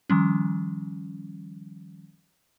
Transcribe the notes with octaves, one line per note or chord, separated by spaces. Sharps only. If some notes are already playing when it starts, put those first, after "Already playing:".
D#3 F3 G3 C#4